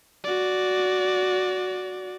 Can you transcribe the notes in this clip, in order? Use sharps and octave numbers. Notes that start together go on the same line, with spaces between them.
F#4 D5